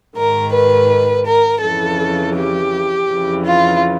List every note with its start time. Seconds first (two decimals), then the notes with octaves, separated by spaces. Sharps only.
0.17 G#2 D#3 A#4
0.54 B4
1.27 A#4
1.62 F2 C#3 E3 A4
2.36 G4
3.08 F2 C#3 E3
3.45 F4